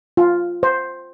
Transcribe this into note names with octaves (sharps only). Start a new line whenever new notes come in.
F4
C5